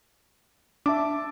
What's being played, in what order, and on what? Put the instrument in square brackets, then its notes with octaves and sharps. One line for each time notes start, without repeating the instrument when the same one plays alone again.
[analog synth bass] D4 [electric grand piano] E5 A5 D6